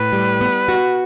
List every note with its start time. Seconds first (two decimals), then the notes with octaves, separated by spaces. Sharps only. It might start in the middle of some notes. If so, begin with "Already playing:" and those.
Already playing: A2 B4
0.12 G3
0.41 B3
0.68 F#4